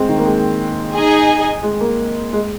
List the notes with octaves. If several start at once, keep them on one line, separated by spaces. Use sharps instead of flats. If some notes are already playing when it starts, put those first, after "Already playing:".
Already playing: G#3 C4
D#3
A#3
G#3
D#4 G#4 D#5 G#5
G#3
A#3
G#3